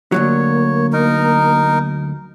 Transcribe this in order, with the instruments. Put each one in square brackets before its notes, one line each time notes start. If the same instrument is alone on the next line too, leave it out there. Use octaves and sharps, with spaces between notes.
[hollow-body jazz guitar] D2 G2 F#3 [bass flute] A#3 [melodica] C#5
[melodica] D#4 A#4